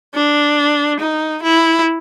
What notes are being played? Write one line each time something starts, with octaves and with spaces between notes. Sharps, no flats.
D4
D#4
E4